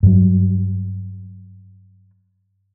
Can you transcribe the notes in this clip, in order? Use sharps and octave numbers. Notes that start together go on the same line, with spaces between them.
G2 F#3